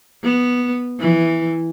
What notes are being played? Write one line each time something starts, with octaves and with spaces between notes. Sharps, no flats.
B3
E3